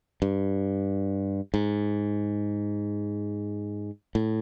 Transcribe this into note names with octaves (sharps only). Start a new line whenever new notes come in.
G2
G#2
A2